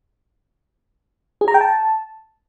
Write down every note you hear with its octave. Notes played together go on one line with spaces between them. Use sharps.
G#4
A#5
G5
A5